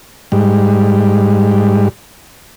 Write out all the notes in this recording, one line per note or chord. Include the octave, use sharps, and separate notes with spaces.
G#2 G3